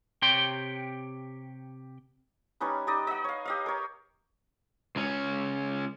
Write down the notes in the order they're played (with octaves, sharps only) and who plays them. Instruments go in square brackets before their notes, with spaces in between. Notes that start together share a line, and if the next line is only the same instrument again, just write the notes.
[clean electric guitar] C3 G4 C#5 G5 C6
[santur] G3 C#4 D#4 B4
D#4 G4 D5 D#5
D#5 F#5
C#5 F5
G4 D#5 F5
A#4 C#5
[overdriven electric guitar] C#2 C#4